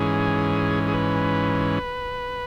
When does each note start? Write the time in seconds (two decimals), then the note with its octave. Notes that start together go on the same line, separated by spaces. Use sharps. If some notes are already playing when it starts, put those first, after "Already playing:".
Already playing: G#2 E3 C#4 G#4
0.88 G#4
0.93 B4